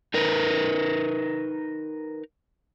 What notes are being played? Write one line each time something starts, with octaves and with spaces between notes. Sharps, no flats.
D#4 A#4 B4